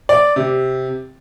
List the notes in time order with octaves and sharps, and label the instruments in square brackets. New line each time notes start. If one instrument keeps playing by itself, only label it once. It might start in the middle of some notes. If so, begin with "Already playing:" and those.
[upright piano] D5
C3